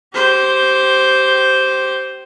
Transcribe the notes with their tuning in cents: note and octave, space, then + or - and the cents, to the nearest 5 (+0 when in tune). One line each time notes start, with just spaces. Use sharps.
G4 -25 C5 +0